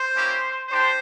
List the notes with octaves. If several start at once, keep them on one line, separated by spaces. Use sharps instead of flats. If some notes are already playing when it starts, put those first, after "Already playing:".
Already playing: C5
A#3 C#4 E4 G4
D4 G4 C5